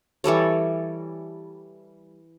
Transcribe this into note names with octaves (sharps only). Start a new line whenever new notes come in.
E3 G3 A4 C#5